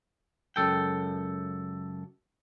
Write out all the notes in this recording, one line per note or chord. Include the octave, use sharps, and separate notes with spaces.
C#2 F#2 F#3 A4 G5